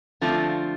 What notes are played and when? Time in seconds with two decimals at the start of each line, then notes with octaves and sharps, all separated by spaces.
0.21 D3 F3 A3 C4 F4